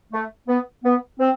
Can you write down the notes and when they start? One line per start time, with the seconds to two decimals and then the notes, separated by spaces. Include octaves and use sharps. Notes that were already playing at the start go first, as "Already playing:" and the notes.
0.13 A3
0.47 B3
0.84 B3
1.19 C4